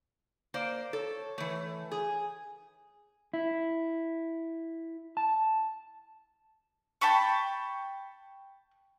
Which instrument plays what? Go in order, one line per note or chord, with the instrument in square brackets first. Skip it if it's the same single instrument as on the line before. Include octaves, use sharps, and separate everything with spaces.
[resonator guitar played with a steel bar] A#3 C5 D5
[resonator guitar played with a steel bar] A4 [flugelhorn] C#5
[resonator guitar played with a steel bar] E3 A3
[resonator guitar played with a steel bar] G#4 [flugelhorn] G#5
[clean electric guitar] E4
A5
[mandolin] G5 A5 B5 C#6